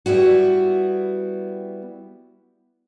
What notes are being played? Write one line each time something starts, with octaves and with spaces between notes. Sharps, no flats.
G3 B3 E4 F#4